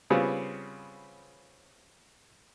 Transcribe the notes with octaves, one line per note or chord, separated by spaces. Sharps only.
C#3 G3 B3 C4 F4